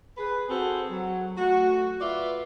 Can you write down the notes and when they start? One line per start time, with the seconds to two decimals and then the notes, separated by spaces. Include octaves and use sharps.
0.18 G#4 B4
0.48 C4 F#4 G#4 A4 C5
0.90 F#3
1.38 A3 F#4
2.01 F4 B4 D5 E5